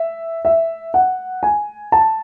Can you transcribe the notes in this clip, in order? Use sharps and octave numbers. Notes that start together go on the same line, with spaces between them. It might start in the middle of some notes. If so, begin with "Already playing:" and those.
Already playing: E5
E5
F#5
G#5
A5